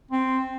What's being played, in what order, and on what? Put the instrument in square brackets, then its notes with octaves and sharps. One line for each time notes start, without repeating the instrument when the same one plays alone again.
[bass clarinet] C4